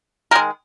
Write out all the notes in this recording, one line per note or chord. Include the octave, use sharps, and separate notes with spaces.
D#3 G#3 A#4